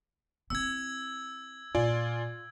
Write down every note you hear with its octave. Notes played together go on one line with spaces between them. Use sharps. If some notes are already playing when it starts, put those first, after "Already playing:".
C4 E4 E6 G#6
A#2 F4 D5 G#5